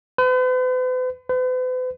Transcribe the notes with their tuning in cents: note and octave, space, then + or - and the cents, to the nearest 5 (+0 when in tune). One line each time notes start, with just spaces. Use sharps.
B4 +45
B4 +45